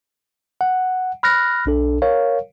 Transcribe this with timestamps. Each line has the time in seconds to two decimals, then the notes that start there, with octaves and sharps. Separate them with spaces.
0.61 F#5
1.23 B5 F6 F#6 A#6
1.66 B1 D4 A4
2.02 A#4 C#5 F5